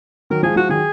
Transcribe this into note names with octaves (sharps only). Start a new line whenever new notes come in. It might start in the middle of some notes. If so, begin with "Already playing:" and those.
D#3 F#3 A#4
F3 G#3 G#4
F3 G#3 F#4
D#3 F#3 G#4